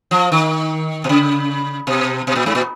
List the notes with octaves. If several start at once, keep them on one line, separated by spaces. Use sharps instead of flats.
F3
D#3
B2
C#3
B2
B2
A#2
G#2
A#2